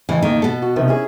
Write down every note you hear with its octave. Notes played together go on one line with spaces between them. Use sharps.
F2 A2 C#3 E3
D#3 A#3
B2 A4
F#4
C3 D#3 F3
C#4 E4 G#4